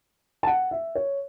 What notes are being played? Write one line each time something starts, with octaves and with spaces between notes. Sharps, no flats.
A5
F#5
E5
C#5